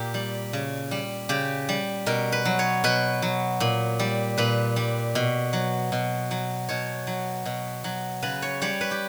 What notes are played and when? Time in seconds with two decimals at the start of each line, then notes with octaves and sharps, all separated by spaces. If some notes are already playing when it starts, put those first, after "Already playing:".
Already playing: A#2 G4 A#4
0.14 G3
0.53 C#3
0.91 G3
1.29 C#3 G4
1.69 G3
2.06 B2 A#4
2.32 B4
2.45 F#3
2.59 C#5
2.84 B2 B4
3.22 F#3
3.60 A#2
3.99 G3
4.37 A#2 B4
4.76 G3
5.15 B2
5.53 F#3
5.92 B2
6.31 F#3
6.69 B2 C#5
7.07 F#3
7.46 B2
7.84 F#3
8.22 C#3 B4
8.42 C#5
8.62 G3 C#5
8.81 B4
8.91 G4